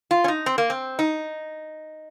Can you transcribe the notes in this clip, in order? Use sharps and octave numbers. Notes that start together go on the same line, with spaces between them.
F4
C#4
D#4
C4
A#3
C4
D#4